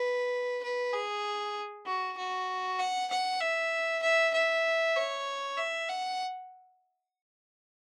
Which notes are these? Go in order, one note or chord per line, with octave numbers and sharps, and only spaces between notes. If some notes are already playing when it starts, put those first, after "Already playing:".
Already playing: B4
B4
G#4
F#4
F#4
F#5
F#5
E5
E5
E5
C#5
E5
F#5